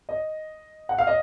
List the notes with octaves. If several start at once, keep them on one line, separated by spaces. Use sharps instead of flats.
D#5
F#5
F5
D#5